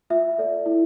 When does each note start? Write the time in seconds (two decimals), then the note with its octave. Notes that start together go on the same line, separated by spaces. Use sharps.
0.10 F4 E5
0.38 A4 D5
0.66 E4